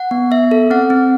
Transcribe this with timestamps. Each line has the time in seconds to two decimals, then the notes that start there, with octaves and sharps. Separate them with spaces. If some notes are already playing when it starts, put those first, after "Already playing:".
Already playing: F#5
0.11 B3
0.31 B3 E5
0.51 A4
0.70 C4 F#5
0.90 C4